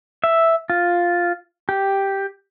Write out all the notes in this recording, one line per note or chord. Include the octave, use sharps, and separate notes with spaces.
E5
F4
G4